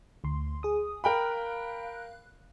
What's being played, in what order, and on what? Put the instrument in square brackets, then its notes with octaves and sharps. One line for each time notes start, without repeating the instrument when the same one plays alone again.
[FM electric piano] D2 C6
G#4 D#6
[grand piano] A#4 G5 B5 [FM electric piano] F5 F#6